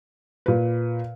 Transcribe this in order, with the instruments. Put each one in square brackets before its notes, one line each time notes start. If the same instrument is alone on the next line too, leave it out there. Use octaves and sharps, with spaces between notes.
[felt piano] A#2 B4